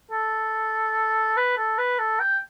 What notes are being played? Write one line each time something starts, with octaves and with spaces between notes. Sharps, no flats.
A4
B4
A4
B4
A4
G5